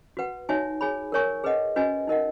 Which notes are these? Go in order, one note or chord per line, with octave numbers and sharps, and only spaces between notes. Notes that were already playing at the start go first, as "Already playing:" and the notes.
F#4 B4 F#5
D#4 F#4 C#5 E5 G#5
G#4 C#5 G#5 B5
A#4 C#5 G#5 C#6
G#4 B4 D#5 F#5
C#4 F#4 B4 D#5 G#5
D#4 A#4 D#5 F#5